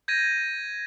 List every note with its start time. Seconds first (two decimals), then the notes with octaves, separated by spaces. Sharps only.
0.08 G6 G#6 A#6 D#7